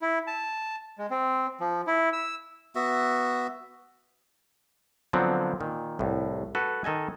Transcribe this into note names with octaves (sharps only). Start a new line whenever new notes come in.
E4
A5
G#3
C4
F3
E4
E6
B3 F#4 E5
D3 F3 F#3 B3 C4
A#2 D#3
C2 A2
F#4 A4 B4
D#3 A4 D#5 G#5